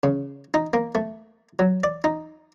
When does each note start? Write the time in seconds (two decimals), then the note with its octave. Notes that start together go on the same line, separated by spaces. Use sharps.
0.03 C#3
0.54 D#4
0.73 A#3
0.95 A3
1.59 F#3
1.84 D5
2.04 D#4